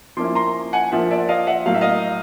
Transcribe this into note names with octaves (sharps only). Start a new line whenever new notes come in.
F3 A#3 C#4 E4 C6 D6
A#5 C6
F#5 G#5
A#2 F3 A#3 E5 F#5
D5 E5
D#5 F5
E5 F#5
A2 F#3 A#3 F5
E5
D#5 F5